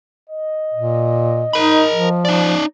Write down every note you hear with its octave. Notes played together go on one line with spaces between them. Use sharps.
D#5
A#2
D#4 A#4 B5
F3
D#4 D5